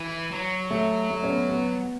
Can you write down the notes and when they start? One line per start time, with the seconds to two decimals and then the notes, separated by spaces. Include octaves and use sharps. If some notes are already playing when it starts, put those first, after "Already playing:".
Already playing: E3
0.32 F#3
0.71 A3
1.10 A3
1.24 C#4
1.30 B3
1.49 B3